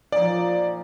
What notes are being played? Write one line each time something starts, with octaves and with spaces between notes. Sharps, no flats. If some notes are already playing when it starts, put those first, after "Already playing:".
A#2 F3 D#4 D5